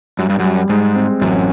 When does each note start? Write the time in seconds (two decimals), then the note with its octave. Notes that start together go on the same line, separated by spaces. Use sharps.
0.19 F#2 G3
0.29 G2
0.39 F#2 G3
0.69 G#2 G#3
0.96 C4
1.21 A1 F#2